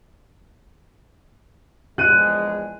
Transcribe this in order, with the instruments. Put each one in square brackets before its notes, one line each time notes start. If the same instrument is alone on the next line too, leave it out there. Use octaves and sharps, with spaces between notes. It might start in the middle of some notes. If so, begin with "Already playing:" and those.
[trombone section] A#1 E2 G#3 [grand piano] F#6 D#7